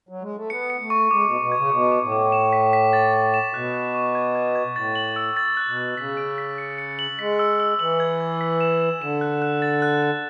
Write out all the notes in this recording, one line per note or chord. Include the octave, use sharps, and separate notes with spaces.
F#3
G#3
A3
B3 C#7
C#7
A3
C#6
G#3 D6
B2
D6
B2
C#3 G#6
B2 D6
D6
A2
D6
E7
B6
B6
A6
A6
E7
B2 F#6
F#6
C#6
G#6
G#6
G#6
A2 A6
F#7
E6
A6
F#6
B2
F#6
C#3 B6
D7
B6
C#7
C#7
F#7
G#3 B6
E6
E6
E3 F#7
G#6
G#6
B6
E7
E7
D3 E7
F#6
F#6
A6
F#6
F#6